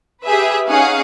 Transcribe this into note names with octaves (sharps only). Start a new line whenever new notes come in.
G4 G#4 B4 E5
C#4 D#4 G#4 F5 F#5